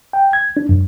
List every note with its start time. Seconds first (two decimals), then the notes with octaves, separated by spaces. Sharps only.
0.13 G5
0.33 G#6
0.57 D4
0.69 F#2